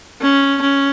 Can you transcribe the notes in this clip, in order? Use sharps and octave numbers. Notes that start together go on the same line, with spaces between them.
C#4
C#4